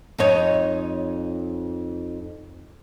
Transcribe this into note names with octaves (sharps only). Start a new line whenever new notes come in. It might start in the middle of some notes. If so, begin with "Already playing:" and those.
F2 D#4 C#5